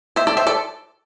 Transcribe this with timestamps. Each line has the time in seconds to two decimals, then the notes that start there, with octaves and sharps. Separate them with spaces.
0.16 C5 E5
0.27 A4 D5
0.37 C5 E5
0.47 A4 D5